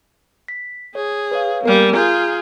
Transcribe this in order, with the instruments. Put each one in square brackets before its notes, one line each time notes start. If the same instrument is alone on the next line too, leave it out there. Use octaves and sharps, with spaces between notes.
[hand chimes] B6
[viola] G#4 [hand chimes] C#5
[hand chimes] B4 C#5 F5
[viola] G3 A#3 [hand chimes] B3 A#4 G#5
[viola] F4 G#4 [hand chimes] G#5 A#5 G6